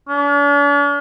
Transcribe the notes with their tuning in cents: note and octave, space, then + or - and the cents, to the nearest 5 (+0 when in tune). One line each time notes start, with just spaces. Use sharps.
D4 -45